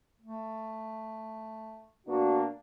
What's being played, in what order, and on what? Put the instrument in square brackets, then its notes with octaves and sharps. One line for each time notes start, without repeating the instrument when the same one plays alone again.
[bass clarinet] A3
[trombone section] B2 A#3 D4 [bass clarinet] F#4